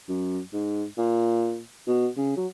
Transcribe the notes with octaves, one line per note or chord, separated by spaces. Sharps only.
F#2
G#2
A#2
B2
C#3
F#3